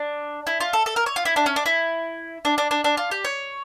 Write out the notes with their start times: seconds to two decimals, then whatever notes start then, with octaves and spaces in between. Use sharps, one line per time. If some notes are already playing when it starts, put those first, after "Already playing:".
Already playing: D4
0.47 E4
0.60 F4
0.73 A4
0.86 A4
0.96 A#4
1.06 C#5
1.16 F4
1.25 E4
1.36 D4
1.46 C#4
1.56 D4
1.66 E4
2.45 D4
2.58 D4
2.71 D4
2.84 D4
2.97 F4
3.11 G4
3.24 C#5